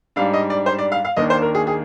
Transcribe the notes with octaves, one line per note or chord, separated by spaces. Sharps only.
G#2 G3 D4 F5
D#5
D5
C5
D5
F5
F5
D#2 D#3 A#3 D4 D#5
C5
A#4
G#4
G#4